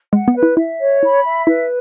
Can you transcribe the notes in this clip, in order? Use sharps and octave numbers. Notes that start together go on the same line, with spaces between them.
G#3 F#5
B3
B4
E4
E4 E5
C#5
E4 B5
E5
E4 B4